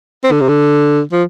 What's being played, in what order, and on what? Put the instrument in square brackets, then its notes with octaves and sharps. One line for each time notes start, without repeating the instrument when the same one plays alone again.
[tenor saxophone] C4
D3
C3
D3
F3